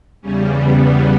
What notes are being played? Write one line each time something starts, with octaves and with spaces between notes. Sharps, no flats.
E2 C#3 G3 C#4
B3